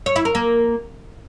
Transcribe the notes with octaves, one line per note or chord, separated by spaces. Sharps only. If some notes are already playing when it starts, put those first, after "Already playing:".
C#5
E4
A#4
A#3